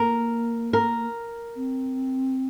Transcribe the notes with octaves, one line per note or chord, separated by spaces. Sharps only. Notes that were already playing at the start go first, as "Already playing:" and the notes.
Already playing: A#3 A#4
A#4
C4